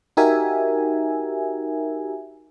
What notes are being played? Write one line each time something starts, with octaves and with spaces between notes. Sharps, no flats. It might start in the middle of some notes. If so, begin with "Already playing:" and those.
D#4 F#4 G4 A#4 E5 G#5